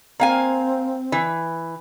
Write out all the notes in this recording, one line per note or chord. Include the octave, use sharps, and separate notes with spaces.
A#3 C4 F5 G#5
E3